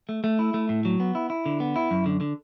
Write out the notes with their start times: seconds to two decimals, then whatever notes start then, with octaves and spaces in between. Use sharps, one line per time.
0.09 A3
0.24 A3
0.39 E4
0.54 A3
0.69 A2
0.85 F#3
1.00 B3
1.15 E4
1.30 E4
1.46 D3
1.60 B3
1.76 E4
1.91 F#2
2.06 D3
2.21 D3